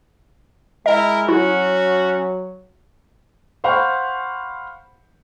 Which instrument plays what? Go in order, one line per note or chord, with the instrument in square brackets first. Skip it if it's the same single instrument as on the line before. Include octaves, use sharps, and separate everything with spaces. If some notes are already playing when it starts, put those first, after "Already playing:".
[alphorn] G#3 [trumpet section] E4 A#4 [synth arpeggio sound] D#5
[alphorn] F#3 [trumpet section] C#4 F#4 [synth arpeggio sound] E4
[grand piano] C5 F5 F#5 B5 C#6